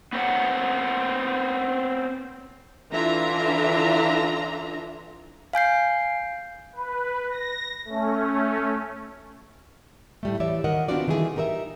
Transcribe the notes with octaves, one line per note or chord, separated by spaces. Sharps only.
B3 C4 C#5 F#5
D3 E3 D4 F4 E5 A#5
F5 G#5 G6 C7
B4
A#6
A3 C#4
A2 G3 A3
E3 G4 C#5 D5 E5
D#3 A#4 D#5 F#5
B3 C4 D4 F4 F#4 D5
D#3 E3 G3 A3 G#4
D#4 G4 A#4 D5 E5